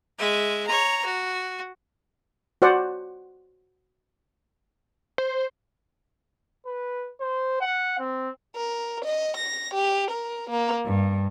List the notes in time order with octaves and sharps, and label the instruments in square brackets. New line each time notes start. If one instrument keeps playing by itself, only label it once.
[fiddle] G#3 E5
C#5 A#5
F#4
[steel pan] F#4 C5 D5 F#5
[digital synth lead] C5
[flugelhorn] B4
C5
F#5
C4
[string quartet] A#4
D#5
A#6
G4
A#4
A#3
G2